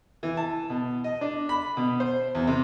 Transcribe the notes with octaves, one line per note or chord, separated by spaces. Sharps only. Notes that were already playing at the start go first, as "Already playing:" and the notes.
E3
A5
B2
D#5
D4
B5
B2
C5
E2
C3